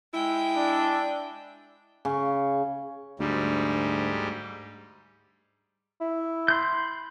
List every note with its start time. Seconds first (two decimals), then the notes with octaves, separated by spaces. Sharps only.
0.14 G#3 E4 G5
0.56 D4
2.05 C#3
3.19 D2 G#2 G3
6.00 E4
6.48 B5 C6 G6